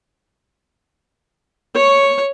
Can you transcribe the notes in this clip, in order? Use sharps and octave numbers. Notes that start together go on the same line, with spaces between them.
C#5 C#6